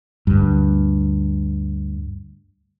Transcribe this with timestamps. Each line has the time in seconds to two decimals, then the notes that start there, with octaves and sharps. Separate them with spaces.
0.27 D2 G2